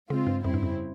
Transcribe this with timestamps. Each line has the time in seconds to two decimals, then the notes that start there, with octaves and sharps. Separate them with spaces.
0.10 C#3 G#3 C4 F4
0.27 G2
0.44 F2 C#3 G3 C4 E4
0.54 G2
0.63 F2